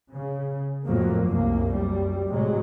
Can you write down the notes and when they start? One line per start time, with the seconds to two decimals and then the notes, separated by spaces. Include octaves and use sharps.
0.11 C#3
0.85 F2 A2 F#3 A#3
1.26 C2 F#2 A2 A#3
1.71 F#2 G3
2.31 A2 C3 F#3 G#3